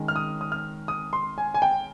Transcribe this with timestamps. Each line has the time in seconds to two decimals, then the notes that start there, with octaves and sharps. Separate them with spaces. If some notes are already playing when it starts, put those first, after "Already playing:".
Already playing: D#3 G#3 C#4
0.08 F6
0.16 D#6
0.41 D#6
0.52 F6
0.88 D#6
1.13 C6
1.38 G#5
1.54 G#5
1.62 G5